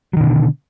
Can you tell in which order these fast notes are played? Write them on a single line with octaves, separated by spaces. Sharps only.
F#3 D#3 B2 D3